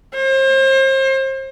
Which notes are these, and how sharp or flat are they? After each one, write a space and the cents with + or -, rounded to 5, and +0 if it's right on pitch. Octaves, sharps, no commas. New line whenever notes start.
C5 +35